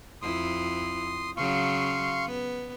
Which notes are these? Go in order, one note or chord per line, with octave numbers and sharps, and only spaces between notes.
F2 E4 C6 D#6
C#3 F#3 F5 C6 C#6
B3